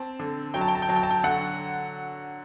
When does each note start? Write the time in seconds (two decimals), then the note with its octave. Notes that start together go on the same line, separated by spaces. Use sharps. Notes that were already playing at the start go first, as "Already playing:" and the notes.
Already playing: C4 A5
0.19 D3
0.54 F#3 G5
0.61 A5
0.68 G5
0.75 A5
0.82 G5
0.89 F#3 A5
0.96 G5
1.03 A5
1.10 G5
1.23 D3 F#5